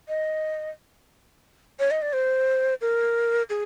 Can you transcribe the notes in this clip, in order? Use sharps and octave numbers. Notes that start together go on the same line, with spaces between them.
D#5
C#5
D#5
D5
C5
A#4
G#4